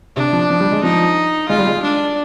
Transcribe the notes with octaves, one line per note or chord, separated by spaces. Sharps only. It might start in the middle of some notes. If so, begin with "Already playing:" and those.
C3 D4
F3
F3
G3
G#3
F3 D#4
G#3 F4
G3
G#3
D4